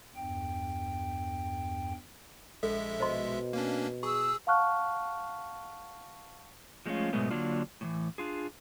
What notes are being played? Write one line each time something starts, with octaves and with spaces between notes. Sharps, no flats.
E2 G2 G5
A#1 G#3 A4 E5
B2 C5 D#5 C6
A#3 C#4 D4
G#4 C#6 E6
F5 F#5 A5 C#6 F6 F#6
F3 G#3 A3 C4 C#4 F4
G#2 B2 F#3 G#3 A3 B3
D3 F#3 A#3 D4 F4
A2 C#3 E3
D4 F4 G#4